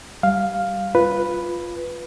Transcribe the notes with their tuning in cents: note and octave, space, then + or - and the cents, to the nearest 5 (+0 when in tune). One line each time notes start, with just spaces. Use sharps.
G3 -10 F5 +0
F4 +0 B4 +0